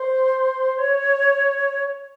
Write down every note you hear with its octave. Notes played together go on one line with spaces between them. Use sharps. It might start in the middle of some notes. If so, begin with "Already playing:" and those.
Already playing: C5
C#5